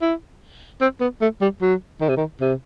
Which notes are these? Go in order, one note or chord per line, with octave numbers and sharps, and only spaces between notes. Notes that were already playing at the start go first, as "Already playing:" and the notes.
E4
C4
B3
A3
G3
F#3
D#3
C3
D#3
C3